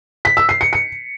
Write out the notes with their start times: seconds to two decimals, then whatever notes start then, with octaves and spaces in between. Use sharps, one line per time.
0.25 B6
0.37 E6
0.49 C7
0.61 C#7
0.73 C#7